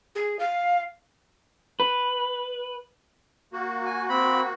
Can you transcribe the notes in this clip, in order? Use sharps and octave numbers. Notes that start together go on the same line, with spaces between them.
G#4
F5
B4
A#3 F#4
G#5
C4 B5